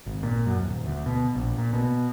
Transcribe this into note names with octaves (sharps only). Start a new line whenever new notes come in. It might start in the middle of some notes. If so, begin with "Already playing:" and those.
G#1
A#2
F#2
D#1
D2
B2
A#1
A#2
B2